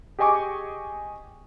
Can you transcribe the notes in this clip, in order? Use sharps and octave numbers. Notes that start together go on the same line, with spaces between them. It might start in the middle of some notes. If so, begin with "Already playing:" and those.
G4 G#4 D#5 G#5 C#6 D6